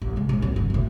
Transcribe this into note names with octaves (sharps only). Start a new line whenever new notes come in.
A1
C3 G#3
A#1 A#2
F#3 C4
G1
B1 A2